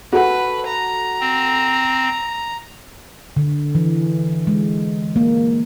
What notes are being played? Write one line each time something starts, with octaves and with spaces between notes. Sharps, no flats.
F#4 A4 B4 F#5
A#5
C4
D3
E3
G#3
A#3